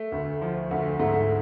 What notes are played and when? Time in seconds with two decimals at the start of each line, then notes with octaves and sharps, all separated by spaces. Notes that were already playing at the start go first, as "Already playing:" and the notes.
Already playing: A3
0.12 D2
0.42 F3
0.71 D2
0.99 G#2 A3